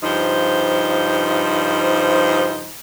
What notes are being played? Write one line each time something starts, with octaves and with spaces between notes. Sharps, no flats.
G2 C#3 F3 D#4 C5